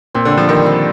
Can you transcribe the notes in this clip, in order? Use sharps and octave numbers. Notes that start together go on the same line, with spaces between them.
A#2 C4
D3
G3
F3
D#3 G3
C4